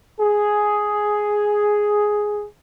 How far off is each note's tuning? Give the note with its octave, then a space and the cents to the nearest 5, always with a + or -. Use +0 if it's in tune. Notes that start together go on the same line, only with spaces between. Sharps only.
G#4 +5